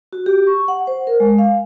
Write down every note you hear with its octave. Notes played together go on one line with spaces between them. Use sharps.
F#4
G4
C#6
F#5
C5
A#4
G#3
F5